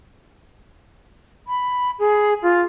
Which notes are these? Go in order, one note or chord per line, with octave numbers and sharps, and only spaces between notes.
B5
G#4
F4